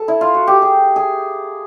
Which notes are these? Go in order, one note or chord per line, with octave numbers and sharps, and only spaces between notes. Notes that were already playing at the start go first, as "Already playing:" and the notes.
Already playing: A4
E4
F4
F#4
G4
G#4
G#4